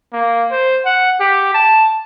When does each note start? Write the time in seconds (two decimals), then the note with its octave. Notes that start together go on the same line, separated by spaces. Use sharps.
0.13 A#3
0.51 C5
0.85 F#5
1.20 G4
1.54 A5